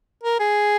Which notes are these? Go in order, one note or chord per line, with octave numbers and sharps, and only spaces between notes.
A#4
G#4